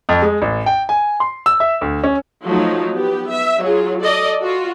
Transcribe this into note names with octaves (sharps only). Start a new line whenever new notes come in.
F2
G#3
A1
G5
G#5
C6
E6
E5
D2
C#4
F3 F#3 A3 D#4
B3 G4
E5
F#3 F4 G#4
A4 D5 D#5
F4 F#4